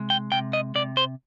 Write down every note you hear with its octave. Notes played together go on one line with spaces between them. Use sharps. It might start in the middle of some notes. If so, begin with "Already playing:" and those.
Already playing: C3 G#3
G5
C3 G5
D#5
C3 D5
C5